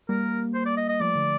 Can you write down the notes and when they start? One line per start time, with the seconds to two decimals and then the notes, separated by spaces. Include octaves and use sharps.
0.09 G3 A#3 A#4
0.54 C5
0.66 D5
0.77 D#5
0.89 D#5
1.00 F3 A3 D5
1.16 D3 F3